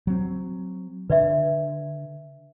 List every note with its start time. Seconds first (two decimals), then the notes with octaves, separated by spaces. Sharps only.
0.07 F#3 C4
1.10 D3 B4 D5 E5